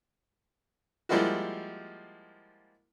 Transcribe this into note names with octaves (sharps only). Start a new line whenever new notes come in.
F3 G3 G#3 A#3 E4 F#4